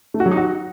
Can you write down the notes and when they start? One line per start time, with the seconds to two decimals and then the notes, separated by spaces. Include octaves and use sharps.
0.14 A3
0.20 F#4
0.26 F#3
0.31 D#4
0.37 F#4